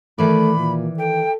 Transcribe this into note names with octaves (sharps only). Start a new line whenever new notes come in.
D#3 E3 A3 D5 B5
A#2
A4 G5